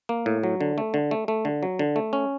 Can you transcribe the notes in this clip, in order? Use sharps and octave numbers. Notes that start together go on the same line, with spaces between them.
A#3
A2
F#3
D3
A3
D3
A3
A3
D3
F#3
D3
A3
C#4